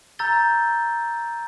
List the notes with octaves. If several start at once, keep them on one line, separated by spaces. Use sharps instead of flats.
A#5 E6 G6 A6 G7